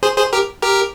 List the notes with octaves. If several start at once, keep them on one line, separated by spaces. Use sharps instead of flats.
G#4 C5
G#4 C5
G4 A#4
G4 A#4